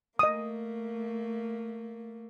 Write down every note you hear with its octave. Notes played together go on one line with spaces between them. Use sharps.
A3 A#3 D#5 D#6